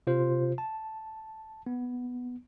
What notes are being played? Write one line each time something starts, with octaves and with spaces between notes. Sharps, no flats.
C3 F4 C5
A5
B3